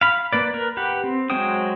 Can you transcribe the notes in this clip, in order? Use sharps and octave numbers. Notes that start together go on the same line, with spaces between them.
F5 B5
A#3 B4 D5
A#4 B4
G4 B4 F#5
C4
F#3 G#3 C5 G5 D#6